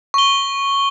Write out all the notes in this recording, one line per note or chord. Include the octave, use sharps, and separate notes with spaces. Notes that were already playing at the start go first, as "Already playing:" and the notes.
C#6 G7